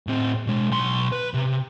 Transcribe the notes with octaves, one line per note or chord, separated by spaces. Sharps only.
A2 C4
B2 G#3
B1 C6
B4
C3